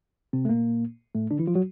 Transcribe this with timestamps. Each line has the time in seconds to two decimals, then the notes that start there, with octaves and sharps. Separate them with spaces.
0.33 C3 C4
0.45 A3
0.49 A#2 A#3
1.15 A2 A3
1.31 D3 D4
1.39 E3 E4
1.47 F3 F4
1.55 F#3 F#4